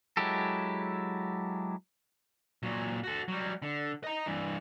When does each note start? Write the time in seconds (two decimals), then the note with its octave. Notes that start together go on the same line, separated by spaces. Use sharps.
0.17 F#3 G#3 E4 G4 A4
2.63 A#2 F#3
3.03 F#4 A4
3.28 F#3 G3
3.62 D3
4.04 D#5 A#5
4.26 G2 E3